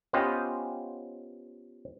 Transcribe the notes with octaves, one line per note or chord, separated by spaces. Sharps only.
B3 C#4 F4 G4 C5 D#5